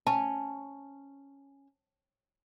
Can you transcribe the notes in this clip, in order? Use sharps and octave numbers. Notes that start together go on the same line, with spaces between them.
C#4 A5